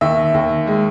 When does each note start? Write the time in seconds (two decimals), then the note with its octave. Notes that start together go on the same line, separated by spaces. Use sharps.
0.01 D#2 E5
0.34 D#2
0.67 G#3